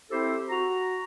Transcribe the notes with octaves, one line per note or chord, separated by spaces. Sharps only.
C4 E4 G4 A4 C5
F#4 A#5